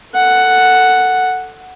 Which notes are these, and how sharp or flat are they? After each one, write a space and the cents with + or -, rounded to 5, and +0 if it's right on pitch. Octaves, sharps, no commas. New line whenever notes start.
A4 +15 F#5 +0